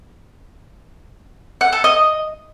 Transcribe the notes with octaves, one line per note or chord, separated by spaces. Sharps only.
F#5
A4
D#5